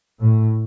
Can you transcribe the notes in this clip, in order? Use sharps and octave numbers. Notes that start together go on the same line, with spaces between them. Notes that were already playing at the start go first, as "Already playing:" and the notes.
A2